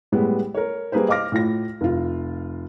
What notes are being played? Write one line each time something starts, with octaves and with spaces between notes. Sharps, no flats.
A2 G3 G#3 B3
A#4 C#5
G3 A#3 G#4 B4 C5
D#5 F5 D6 F6 A#6
A2 F4 A#6
F1 F4